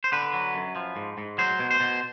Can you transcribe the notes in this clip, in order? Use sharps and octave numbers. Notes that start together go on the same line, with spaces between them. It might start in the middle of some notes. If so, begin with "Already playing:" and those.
C5
D3 B4
F#3
F#2
F3
G#2
G#2
F#3 C5
B2
C5
B2